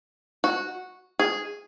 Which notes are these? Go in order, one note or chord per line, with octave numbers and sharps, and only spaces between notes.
F#4
G#4